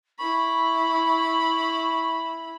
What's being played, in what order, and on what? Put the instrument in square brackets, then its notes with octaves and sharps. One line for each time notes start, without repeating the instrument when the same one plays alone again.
[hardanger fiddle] E4 B5 [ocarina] C#6